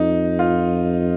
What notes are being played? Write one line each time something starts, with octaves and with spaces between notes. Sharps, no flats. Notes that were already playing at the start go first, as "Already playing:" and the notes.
Already playing: F2 D#4
F4